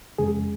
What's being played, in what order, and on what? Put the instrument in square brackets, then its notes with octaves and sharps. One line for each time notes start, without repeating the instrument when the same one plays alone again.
[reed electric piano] F2 C#3 G#3 G#4